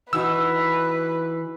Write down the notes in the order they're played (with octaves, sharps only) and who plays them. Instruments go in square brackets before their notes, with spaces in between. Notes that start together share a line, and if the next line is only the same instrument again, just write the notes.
[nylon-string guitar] E3 D#4 F#4 [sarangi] B4 [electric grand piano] E6